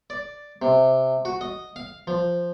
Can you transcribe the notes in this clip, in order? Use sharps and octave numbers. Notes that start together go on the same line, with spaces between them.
D5
C3
F#4
D#5
F5
F3